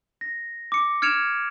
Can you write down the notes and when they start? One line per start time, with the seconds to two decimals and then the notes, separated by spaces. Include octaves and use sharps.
0.21 A#6
0.72 D6 C#7
1.02 F6 G#6 C#7 D7 E7 F7